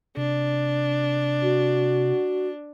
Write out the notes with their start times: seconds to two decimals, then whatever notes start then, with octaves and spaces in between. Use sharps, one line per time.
0.17 C3 D4
1.42 F#4